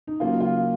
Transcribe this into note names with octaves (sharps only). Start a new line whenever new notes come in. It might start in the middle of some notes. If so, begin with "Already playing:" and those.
D#4
C#3 F#3 A#3 F4
F4